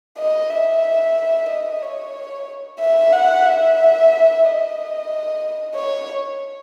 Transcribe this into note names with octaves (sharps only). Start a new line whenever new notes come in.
D#5
E5
D#5
C#5
E5
F#5
E5
D#5
C#5